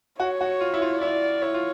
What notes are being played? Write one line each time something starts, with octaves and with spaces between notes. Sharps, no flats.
F#4 C#5
F#4
F4
E4
F4
E4 D5
E4 C#5
F4